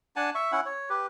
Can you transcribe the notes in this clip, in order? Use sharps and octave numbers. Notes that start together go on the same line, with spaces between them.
D4 F#5 G#5 A5
E5 C#6
C#4 E4 F#5
C#5
G4 B4